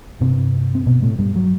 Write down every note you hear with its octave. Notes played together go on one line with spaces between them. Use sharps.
G2 C3 C4
C4
B2 B3
A2 A3
G2 G3
F#3